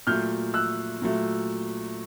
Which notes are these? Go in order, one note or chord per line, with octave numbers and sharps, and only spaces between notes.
A#2 F#3 A3 F6 G6
E6 F#6
A#2 F#3 A3